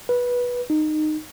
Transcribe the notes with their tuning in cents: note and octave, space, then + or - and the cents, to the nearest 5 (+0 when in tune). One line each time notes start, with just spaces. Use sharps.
B4 -15
D#4 -20